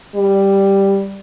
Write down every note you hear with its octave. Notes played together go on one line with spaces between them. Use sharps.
G3